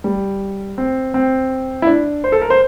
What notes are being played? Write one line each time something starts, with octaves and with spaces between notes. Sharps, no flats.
G3
C4
C4
E4
D4
C5
A4
A#4
C5